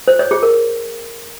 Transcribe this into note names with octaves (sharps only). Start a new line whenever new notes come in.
C5
C#5
G#4
A#4